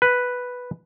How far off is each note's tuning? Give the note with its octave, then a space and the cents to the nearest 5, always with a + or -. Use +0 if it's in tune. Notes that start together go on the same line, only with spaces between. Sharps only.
B4 +0